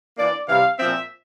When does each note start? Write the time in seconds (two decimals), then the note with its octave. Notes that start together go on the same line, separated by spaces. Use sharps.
0.18 E3 A#3 D4 D5
0.48 C3 E3 G3 F5
0.78 A#2 F3 C4 E5